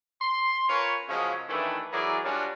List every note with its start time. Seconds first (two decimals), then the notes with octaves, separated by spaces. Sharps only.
0.22 C6
0.69 C#4 F4 A#4 B4 C#5
1.09 C#3 F3 F#3 G#3 A#3 C#4
1.49 D#3 E3 G3 A3 D4 E4
1.93 E3 F#3 E4 G#4 A#4 D5
2.25 G3 C#4 D4 F4 F#4